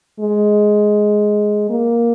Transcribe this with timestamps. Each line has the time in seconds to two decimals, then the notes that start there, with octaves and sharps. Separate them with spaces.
0.20 G#3
1.70 A#3